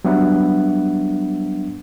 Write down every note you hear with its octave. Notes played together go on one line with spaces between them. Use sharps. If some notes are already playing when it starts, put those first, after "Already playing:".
F#3 G3 B3 D4 E5 F#5